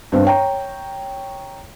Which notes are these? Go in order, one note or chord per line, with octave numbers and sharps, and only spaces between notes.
G2 C4
C#5 G5 A#5